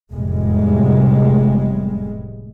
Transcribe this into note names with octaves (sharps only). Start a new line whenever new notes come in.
F1 E2 A2 G3 G#3